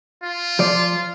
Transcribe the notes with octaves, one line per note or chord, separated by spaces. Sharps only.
F4
F3 D5